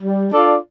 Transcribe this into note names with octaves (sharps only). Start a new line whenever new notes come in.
G3
D4 F4 A4 D5